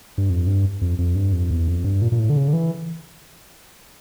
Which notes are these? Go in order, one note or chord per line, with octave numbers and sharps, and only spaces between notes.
G2
F2
G2
F2
F2
G2
F2
E2
F2
G2
A#2
A#2
A2
D3
C#3
D3
E3